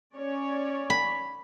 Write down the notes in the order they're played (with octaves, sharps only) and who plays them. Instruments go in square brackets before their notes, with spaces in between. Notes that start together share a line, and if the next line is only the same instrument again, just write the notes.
[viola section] C#4 C#5 D5
[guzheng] B5